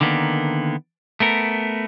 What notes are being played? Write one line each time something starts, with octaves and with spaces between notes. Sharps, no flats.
D3 D#3 A#3 B3
A3 B3 A#4